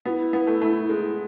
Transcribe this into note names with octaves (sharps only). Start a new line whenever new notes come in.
B3 E4 F#4
B3
A3
A3
G#3